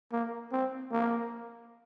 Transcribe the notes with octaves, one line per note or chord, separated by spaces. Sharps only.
A#3
C4
A#3